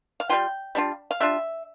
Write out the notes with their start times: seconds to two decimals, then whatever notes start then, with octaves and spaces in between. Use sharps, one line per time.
0.20 F5
0.29 G3 D4 F4 G5
0.75 G3 D4 F4
1.11 F5
1.20 G3 D4 F4 E5